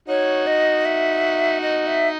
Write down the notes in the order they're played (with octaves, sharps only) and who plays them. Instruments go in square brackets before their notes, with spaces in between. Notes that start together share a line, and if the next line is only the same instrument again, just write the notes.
[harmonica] D#4 F#4 [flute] C#5
[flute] D#5
E5
D#5
E5